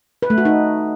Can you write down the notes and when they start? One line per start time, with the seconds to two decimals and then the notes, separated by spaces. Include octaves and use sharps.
0.22 B4
0.30 A3
0.38 F#4
0.45 D#4